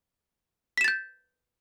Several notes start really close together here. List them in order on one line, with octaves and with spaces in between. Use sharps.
B6 E7 A6 G6